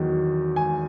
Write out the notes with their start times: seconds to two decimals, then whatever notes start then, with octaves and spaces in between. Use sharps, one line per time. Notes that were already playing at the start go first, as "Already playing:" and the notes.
Already playing: E2 D#3 F#3
0.56 G#5